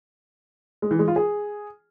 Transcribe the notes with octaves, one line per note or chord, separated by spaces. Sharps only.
G#3
E3
G#3
F4
G#4